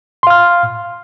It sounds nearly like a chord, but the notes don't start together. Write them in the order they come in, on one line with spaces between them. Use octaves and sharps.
C6 F5 F6